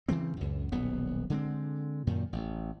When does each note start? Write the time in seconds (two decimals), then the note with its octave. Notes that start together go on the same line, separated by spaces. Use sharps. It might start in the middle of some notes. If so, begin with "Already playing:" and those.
0.09 C#3 E3 A3 C4
0.37 C#2 F#2
0.72 D#1 B1 B3
1.30 D3 G#3 C4
2.07 F#2 A#2 D#3
2.33 A1